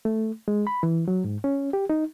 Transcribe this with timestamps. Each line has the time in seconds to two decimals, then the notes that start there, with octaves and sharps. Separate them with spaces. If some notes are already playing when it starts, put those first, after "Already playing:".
0.05 A3
0.48 G#3
0.67 B5
0.83 E3
1.08 F#3
1.24 G#2
1.44 C#4
1.73 G4
1.90 D#4